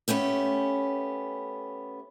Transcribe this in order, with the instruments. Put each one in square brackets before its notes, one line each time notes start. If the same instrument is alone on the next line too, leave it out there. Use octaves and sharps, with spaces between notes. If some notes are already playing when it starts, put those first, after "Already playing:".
[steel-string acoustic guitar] A3 B3 C#4 G4